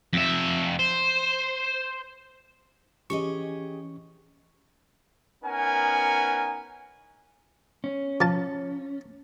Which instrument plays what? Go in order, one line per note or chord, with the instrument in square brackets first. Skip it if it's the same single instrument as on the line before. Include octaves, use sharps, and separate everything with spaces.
[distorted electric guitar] F2 E5
C5
[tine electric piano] E3 C#4 C#6 [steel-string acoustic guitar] G4 G#4 D#5
[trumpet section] B3 C#4 D#4 A#4 F#5 G#5
[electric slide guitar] C#4
[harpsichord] F3 A5